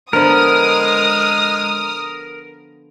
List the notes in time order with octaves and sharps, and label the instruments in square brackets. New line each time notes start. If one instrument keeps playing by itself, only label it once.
[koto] D3 F3 B3 [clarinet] G#3 [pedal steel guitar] A#4 [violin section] D#6 F6